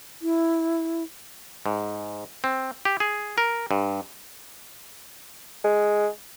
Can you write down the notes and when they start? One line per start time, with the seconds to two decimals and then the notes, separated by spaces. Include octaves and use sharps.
0.22 E4
1.66 G#2
2.44 C4
2.85 G4
3.00 G#4
3.38 A#4
3.71 G2
5.64 G#3